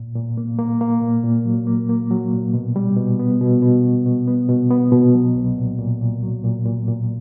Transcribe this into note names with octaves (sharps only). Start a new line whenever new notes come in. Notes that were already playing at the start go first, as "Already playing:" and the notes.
Already playing: A#2
A#2
A#3
A#3
A#3
A#2
A#2
F#3
A#3
A#3
F#3
A#2
B2
G3
B2
B3
B2
B2
B2
B2
B3
B2
B3
B2
F#3
C2
A#2
A#2
A#2
F#3
A#2
A#2
A#2